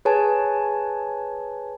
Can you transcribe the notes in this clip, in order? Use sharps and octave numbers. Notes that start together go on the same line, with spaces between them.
G#4 B4 C#5 G#5 A5